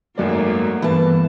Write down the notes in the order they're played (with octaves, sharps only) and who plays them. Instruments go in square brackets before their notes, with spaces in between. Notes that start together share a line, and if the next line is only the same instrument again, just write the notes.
[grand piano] G#1 F#2 D5 [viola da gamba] F#3 A3 A#3
[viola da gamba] G2 [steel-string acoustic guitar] E3 A5 [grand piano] B3